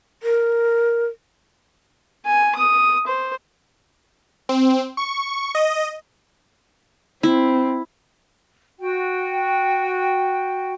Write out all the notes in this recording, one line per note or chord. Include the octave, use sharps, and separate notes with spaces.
A#4
G#5
D#6
C5
C4
C#6
D#5
C4 E4
F#4 G5